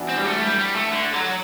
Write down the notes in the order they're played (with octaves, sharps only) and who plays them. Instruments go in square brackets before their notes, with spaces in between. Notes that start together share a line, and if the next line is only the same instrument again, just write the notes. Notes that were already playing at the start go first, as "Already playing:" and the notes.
Already playing: [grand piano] E3 B3 D4 F#4
[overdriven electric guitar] C4
G3
A3
G3
G3
A3
D3
F#3